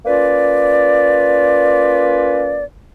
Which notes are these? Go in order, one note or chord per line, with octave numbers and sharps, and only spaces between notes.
A#3 C#4 F4 B4 D5